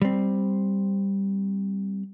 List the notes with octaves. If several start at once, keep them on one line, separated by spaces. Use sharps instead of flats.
G3 C4